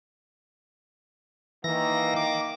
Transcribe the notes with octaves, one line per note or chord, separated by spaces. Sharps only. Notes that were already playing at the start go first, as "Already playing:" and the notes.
D#3 E3 A#3 A#6
D6